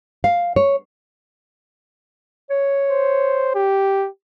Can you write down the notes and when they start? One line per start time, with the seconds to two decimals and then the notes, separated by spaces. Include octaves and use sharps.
0.24 F5
0.56 C#5
2.50 C#5
2.90 C5
3.55 G4